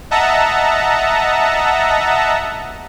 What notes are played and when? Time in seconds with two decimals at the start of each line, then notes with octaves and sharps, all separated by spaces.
0.11 D#5 E5 F#5 A5 A#5